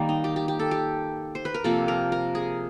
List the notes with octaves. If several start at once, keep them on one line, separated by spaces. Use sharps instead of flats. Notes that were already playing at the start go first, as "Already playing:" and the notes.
Already playing: D#3 G3 A#3
D#4
G4
G4
G4
A4
G4
C5
B4
A#4
C3 F3 A#3 A4
A#4
A#4
G#4